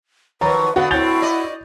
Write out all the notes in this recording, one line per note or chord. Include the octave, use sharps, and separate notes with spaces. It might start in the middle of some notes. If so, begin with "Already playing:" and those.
D#3 F3 F#3 B4 A#5
D3 B3 F#4 F5
A2 C4 E4 G6 A6 F7
D5 D#5